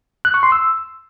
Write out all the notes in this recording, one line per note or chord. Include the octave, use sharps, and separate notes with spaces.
F#6
C#6
C6
E6